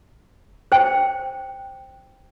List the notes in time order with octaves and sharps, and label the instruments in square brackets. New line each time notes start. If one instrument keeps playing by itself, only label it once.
[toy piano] C5 G5